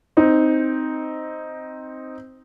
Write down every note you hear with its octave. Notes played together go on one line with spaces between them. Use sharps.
C4 D#4